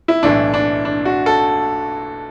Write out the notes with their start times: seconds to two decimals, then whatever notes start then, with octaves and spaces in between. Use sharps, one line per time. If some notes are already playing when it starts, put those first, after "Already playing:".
0.08 E4
0.23 B1 A2 E3 D4
0.54 D4
0.85 D4
1.05 F#4
1.26 A4